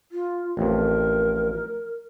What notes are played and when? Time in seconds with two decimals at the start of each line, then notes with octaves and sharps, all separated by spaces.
0.12 F4
0.57 A1 F2 A#4